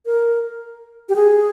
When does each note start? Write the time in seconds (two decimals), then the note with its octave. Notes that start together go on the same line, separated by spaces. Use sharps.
0.06 A#4
1.09 G4
1.16 G#4